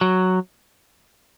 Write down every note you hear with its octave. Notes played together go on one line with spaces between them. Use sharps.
F#3